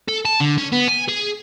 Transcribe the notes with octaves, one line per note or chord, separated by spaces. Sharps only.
A4
A5
D3
C#4
B3
G#5
G#4